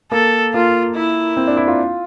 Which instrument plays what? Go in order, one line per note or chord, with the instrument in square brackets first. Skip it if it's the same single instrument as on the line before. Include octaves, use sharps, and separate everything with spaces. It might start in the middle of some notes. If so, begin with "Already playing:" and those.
[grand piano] A#3 [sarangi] A4
[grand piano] A#3 [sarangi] F4
[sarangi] E4
[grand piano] C4
D4
E4
F4